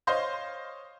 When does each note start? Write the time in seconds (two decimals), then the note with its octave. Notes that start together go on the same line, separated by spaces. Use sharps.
0.07 C5 C#5 D#5 F5 C6 G6